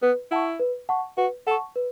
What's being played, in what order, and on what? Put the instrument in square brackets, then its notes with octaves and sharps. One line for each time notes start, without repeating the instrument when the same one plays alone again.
[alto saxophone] B3 [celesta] B4
[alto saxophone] E4 [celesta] F#5 A5 C#6
[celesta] B4
F#5 A5 C#6
[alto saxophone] F#4 [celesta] B4
[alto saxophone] A4 [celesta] F#5 A5 C#6
[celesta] B4